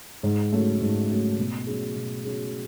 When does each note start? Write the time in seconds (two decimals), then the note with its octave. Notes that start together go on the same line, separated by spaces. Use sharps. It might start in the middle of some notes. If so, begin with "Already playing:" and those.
0.23 G#2
0.52 F#3 A3 C#4
0.81 G#2
1.09 F#3 A3 C#4
1.38 B2
1.67 F#3 C#4 G#4
1.96 B2
2.25 F#3 C#4 G#4